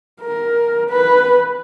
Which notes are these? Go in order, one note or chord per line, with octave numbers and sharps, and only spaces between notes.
A#4
B4